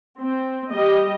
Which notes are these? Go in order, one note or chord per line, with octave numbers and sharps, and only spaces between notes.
C4
G3 G4 D#5